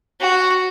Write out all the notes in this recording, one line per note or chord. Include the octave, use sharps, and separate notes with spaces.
F#4